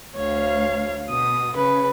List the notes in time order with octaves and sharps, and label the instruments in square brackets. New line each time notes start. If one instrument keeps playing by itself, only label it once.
[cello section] D2 F5 [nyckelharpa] C#5
[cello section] B2 [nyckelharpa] D#6
[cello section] C#3 [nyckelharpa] B4